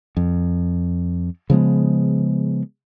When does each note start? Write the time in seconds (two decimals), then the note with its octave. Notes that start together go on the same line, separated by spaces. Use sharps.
0.17 F2
1.50 C#3 F3 G#3 B3